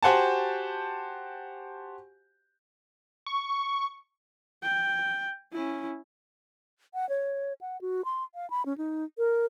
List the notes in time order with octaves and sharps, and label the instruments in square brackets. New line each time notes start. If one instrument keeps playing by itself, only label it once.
[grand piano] F#4 G4 C5 F#5 G#5 A5
[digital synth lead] C#6
[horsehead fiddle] G5
C#4 E4
[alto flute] F#5
C#5
F#5
F#4
C6
F5
B5
C#4
D#4
A#4